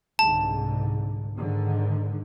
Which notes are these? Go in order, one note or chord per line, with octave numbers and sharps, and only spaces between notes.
C2 G#2 D3 A5
G#2 D3 D#3